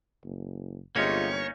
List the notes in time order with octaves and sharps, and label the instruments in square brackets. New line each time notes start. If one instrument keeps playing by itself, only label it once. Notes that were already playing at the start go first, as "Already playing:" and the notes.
[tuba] F#1
[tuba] G1 [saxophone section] C3 G#3 F4 [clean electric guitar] A#3 C#4 D#4 [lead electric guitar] C#5